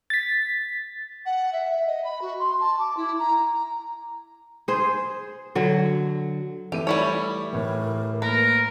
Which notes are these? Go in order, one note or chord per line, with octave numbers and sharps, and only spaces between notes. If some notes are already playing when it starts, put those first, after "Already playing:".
A6 B6
F#5
E5
D#5
B5
F#4
C6
A5
D6
E4
A#5
A#5
G#4 C5
D3 F#3
E3 A3 G4 D#7
G3 E4 C#5
A2 E3 A#4
A#3 A#4 B4